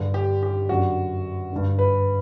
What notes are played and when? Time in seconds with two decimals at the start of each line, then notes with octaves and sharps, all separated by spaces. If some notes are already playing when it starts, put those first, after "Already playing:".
Already playing: G2 D3
0.14 G4
0.43 G4
0.69 F#2 D3 F#4
1.52 G2 D3
1.79 B4